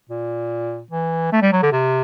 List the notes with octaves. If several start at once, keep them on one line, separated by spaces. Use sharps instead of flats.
A#2
E3
A3
G3
F#3
D3
C3